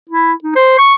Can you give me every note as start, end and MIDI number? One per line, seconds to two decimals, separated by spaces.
0.09 0.33 64
0.44 0.53 63
0.56 0.74 72
0.78 0.95 85